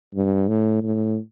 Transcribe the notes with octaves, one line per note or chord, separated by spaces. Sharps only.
G2
A2
A2